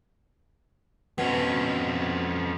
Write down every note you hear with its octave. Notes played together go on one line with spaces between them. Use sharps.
F2 B2 C#4